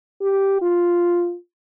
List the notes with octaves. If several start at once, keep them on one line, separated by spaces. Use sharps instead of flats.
G4
F4